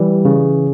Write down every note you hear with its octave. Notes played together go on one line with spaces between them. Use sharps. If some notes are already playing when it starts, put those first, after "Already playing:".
Already playing: E3 G3
C#3